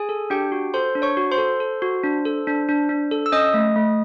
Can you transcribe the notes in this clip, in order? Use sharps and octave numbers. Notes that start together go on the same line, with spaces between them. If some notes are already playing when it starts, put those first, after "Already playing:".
Already playing: G#4 G#5
A4
D4 G4 G5
F#4
A4 C5 C6
D4
C#5 C#6
F#4
C5 C6
A4
A4
F#4
D4
A4
D4
D4
D4
A4
E6
C#4 D#5 D#6
A3
A3